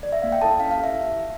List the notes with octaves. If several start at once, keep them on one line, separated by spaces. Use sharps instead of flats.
D5
E5
A#3 F5
G5
E4 A4 A5
C#4 F5
F5
E4 G4
E5